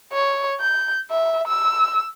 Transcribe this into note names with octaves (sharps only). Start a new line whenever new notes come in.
C#5
G6
E5
E6